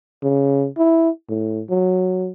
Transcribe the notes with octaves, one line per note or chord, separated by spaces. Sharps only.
C#3
E4
A2
F#3